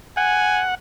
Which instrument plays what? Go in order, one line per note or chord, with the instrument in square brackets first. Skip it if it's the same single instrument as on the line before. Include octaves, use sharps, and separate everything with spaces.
[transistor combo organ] F#5 [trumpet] G#5